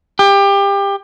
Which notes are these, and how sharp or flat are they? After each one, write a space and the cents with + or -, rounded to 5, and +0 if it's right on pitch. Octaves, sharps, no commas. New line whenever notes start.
G4 +25